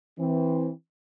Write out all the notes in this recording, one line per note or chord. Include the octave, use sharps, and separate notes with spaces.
E3 C4